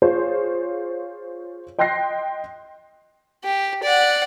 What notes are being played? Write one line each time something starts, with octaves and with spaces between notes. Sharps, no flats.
F4 G#4 C5 C#5
D#5 G5 C6 F#6 A#6 C7
G4
D5 F#5